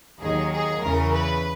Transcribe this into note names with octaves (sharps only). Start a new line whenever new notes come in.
D#2 D#3 F#3 G#4
G#4
E2 C#3 E3 A#4
B4